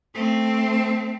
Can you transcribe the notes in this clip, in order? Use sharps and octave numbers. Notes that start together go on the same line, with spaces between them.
A3 C4